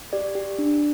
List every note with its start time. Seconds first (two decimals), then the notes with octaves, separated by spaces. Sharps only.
0.13 G4 D5
0.35 G4
0.59 D4